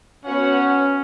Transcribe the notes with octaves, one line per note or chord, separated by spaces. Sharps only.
B3 C#4 F#4 C#5 F#5